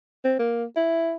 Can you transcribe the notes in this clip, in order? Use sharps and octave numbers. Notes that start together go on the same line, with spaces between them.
C4
A#3
E4